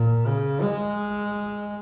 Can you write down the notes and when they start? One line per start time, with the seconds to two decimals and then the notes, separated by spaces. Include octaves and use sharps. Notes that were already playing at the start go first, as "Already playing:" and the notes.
Already playing: A#2
0.27 C#3
0.62 G#3